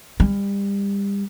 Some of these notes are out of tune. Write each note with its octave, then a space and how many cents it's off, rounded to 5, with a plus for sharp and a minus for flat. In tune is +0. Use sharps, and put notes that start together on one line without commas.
G3 +30